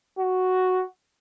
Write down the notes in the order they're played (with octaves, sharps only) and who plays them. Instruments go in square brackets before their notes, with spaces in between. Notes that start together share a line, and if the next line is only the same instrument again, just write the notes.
[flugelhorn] F#4